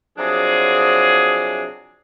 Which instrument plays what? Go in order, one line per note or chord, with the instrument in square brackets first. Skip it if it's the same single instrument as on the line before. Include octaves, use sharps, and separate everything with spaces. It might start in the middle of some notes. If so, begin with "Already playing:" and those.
[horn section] C3 F3 F#3 D4 G#4